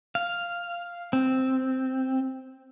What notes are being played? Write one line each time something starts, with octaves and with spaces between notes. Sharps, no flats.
F5
C4